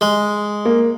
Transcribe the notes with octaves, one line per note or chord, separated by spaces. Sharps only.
G#3
A#3